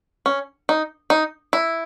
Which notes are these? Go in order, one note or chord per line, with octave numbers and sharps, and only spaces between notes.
C#4
D#4
D#4
E4